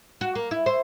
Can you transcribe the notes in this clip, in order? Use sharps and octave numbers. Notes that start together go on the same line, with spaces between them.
F#4
A#3
E4
C5